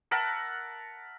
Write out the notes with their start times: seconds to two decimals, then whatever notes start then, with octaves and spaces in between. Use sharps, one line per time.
0.11 A#4 E5 F#5 A5